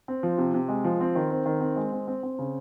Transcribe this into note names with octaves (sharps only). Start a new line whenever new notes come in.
C4
F3
C3
C3
G#3
F3
C4
D#3
C4
D#3
C4
G#3
C4
C4
C4
C#3